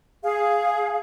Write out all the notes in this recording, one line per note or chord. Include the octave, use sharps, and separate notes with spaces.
G#4 F5